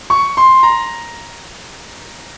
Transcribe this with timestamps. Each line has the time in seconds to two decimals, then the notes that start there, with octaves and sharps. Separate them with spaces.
0.10 C#6
0.37 C6
0.63 A#5